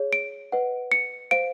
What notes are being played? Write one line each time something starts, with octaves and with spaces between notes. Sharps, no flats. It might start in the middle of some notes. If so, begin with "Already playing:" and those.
Already playing: G#4 C#5
D7
B4 D#5 F#5
C#7
C5 F5 D7